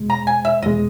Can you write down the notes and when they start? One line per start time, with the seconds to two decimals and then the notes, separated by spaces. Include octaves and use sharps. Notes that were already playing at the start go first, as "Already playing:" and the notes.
Already playing: E2 B2 G#3
0.10 A#5
0.27 G#5
0.45 E5
0.62 E2 B2 G#3 D#5